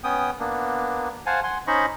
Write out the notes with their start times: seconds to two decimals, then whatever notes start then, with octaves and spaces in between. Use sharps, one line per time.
0.04 B3 C#4 G5 D#6
0.40 A#3 B3 D4
1.26 C5 F5 F#5 G#5 A5
1.44 F#5 G#5 C6
1.67 C#4 D#4 C5 D#5 B5 C#6